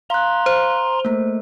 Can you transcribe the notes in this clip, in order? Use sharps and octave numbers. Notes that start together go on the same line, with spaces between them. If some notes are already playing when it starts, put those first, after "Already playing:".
F5 A#5 C6 F#6
C5
A3 A#3